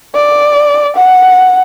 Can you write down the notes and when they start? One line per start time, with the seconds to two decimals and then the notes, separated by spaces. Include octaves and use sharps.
0.15 D5
0.96 F#5